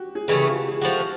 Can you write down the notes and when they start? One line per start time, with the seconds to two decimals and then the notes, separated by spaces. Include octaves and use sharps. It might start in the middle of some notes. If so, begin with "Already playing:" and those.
Already playing: F#4 G4
0.15 G#4
0.28 C#3 E3 A3 G4
0.41 G4
0.49 F4
0.56 F#4
0.68 G#4
0.81 F3 A3 D4 F#4 G4